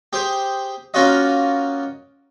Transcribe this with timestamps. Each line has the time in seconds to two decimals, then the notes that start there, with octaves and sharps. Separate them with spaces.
0.13 G4 G#4 C5
0.94 A#3 C#4 F4 F#4 D#5